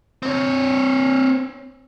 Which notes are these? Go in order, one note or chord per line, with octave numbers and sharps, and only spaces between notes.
C4 C#5